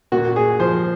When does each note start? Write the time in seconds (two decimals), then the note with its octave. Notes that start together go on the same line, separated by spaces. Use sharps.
0.12 A#2 F#4
0.36 G#4
0.59 F3 C5